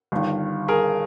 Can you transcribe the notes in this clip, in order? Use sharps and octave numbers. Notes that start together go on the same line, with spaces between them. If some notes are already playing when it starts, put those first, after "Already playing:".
G1 G2 D#3
G#4 A#4